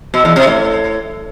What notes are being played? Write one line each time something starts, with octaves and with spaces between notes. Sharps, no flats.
B2
E2
C3
A2